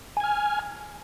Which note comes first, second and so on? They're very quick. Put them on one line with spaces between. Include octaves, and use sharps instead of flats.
G#5 G#6 F6